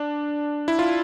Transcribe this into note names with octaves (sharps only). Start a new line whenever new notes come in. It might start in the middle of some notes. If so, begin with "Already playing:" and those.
Already playing: D4
E4
F4